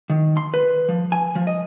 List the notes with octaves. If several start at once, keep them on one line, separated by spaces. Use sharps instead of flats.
D#3
C6
B4
F3
G#5
F3
D#5